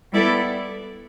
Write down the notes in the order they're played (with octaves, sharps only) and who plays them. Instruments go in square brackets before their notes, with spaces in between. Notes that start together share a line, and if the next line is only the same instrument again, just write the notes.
[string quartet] G3 B3 E4 A4 D5